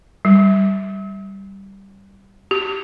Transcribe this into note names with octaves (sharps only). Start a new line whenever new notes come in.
G3
G4